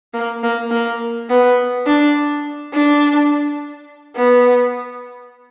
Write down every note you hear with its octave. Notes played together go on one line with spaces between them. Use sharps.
A#3
A#3
A#3
B3
D4
D4
B3